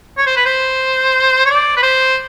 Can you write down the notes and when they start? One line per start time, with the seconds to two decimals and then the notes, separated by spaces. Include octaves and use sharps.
0.17 C#5
0.26 C5
0.36 B4
0.46 C5
1.46 C#5
1.50 D5
1.77 B4
1.83 C5